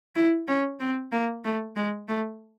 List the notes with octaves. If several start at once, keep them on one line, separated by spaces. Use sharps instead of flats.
E4
C#4
C4
A#3
A3
G#3
A3